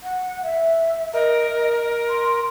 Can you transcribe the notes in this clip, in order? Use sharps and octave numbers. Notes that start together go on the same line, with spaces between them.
F#5
E5
A#4 D#5
C6